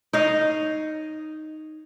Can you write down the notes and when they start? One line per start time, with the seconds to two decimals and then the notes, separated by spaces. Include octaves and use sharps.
0.13 D#4 C#5 D#5 F5